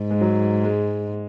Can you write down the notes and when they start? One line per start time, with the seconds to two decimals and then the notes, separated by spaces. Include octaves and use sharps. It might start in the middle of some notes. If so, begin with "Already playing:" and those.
Already playing: G#2
0.10 G#3
0.21 F#3
0.64 G#3